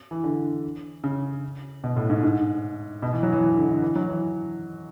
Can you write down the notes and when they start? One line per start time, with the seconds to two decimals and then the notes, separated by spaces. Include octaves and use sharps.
0.11 E3
0.24 D3
1.04 C#3
1.84 B2
1.97 A2
2.10 G#2
2.23 G#2
3.02 B2
3.13 E3
3.23 F#3
3.32 E3
3.43 E3
3.56 D3
3.68 D3
3.82 E3
3.96 F#3
4.09 E3